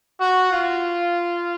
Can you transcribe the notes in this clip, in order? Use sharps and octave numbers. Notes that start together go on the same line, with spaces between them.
F#4
F4